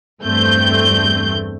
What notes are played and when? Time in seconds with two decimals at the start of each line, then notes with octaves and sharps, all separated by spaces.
0.22 E2 G2 A3 C4 G6